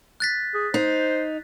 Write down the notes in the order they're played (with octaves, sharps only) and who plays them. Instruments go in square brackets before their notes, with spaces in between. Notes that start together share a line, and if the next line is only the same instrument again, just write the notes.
[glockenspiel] F#6 A6 B6
[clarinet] G#4
[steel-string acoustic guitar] D#4 [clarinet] C5